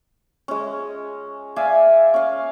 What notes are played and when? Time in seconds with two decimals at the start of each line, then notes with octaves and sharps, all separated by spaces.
0.48 G#3 C#4
1.56 D5 E5 F5 G#5
2.14 C#4 F5